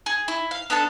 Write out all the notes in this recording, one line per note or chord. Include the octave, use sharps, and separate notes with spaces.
G#4
E4
F5
B3 D4 A4 A5